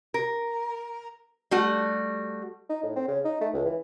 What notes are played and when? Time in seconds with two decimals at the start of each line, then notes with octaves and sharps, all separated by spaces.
0.14 A#4
1.51 G3 A3 F#4
2.69 D#4
2.83 A2
2.96 C4
3.08 C#3
3.25 D#4
3.41 A3
3.54 C#2
3.65 E3